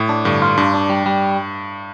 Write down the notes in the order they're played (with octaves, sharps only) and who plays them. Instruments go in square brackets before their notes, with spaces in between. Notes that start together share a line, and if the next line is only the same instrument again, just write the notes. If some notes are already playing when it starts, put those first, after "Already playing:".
Already playing: [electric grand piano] A2
[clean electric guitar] D4
[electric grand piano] G2 [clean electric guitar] D3
[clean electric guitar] F4
[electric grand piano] G2 [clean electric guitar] D4
[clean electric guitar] D4
G3
G3